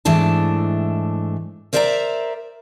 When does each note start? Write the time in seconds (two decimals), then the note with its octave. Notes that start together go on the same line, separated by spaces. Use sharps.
0.05 G#2 E3 A3 D4 A5
1.73 A#4 C5 D5 E5 G#5 A#5